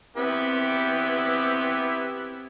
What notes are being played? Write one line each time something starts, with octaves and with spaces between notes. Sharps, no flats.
B3 C4 E4 G4